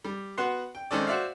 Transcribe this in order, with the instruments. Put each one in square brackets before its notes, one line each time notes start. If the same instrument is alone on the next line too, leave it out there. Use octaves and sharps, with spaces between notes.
[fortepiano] G3
B3 F#4 F#5 C6
G5
D#3 G#3 C4 C#4 A4 D5
F#4 C5 D5 E5 F5